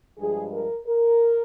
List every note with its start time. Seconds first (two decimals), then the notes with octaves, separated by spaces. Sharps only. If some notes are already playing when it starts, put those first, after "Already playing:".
0.18 G2 F3 G#3 G#4
0.52 A#4
0.86 A#4